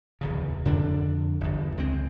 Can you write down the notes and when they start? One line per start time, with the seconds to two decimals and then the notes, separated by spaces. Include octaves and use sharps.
0.21 D1 E2 C#3
0.65 F2 D3 D4
1.41 G1 E2
1.77 C#2 G#3 C4